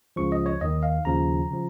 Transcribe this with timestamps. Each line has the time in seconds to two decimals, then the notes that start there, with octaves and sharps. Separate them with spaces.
0.16 C#2 C#3 F3 C#6
0.32 D#5
0.46 C#5
0.61 D#2 D#3 D#5
0.83 F5
1.05 D#2 C#3 F3 A#5
1.51 C#3 F3